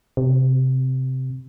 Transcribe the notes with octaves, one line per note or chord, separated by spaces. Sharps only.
C3